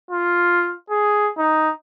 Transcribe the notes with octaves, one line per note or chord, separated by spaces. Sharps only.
F4
G#4
D#4